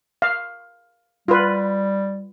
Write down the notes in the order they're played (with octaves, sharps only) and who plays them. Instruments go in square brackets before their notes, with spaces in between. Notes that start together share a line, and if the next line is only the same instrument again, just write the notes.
[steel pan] F5
[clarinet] G3 [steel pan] F4 B4